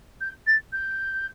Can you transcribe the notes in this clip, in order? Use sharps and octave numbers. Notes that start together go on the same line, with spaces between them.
G6
A6
G6